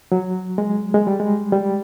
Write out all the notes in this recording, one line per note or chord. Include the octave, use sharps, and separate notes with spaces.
F#3
G#3
G#3
G3
G#3
G3